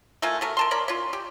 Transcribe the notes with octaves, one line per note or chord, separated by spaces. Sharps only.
A3 A#3 F4 G#5
B2 A3 A#4
A#4 A5 C6
C#4 A#4 D5 B5
C#4 F4
G4